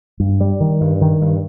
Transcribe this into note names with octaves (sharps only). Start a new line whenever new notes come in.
G2
G3
D#3
G2
D#3
G2